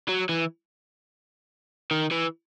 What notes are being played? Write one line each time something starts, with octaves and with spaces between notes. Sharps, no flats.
F#3
E3
D#3
E3